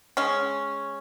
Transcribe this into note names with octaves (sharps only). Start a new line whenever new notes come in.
G#3 C#4